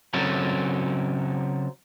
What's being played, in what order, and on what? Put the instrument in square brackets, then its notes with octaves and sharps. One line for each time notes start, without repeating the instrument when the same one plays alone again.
[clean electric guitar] C#3 F#3 C4 A4 A#4